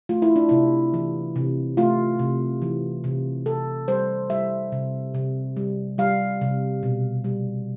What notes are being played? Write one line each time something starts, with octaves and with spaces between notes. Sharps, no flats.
A3 F4
E4
D4
C3 E4
E3
C3
A3 F4
C3
E3
C3
C3 A4
G3 C5
G3 E5
C3
C3
G3
G3 F5
C3
B2
G3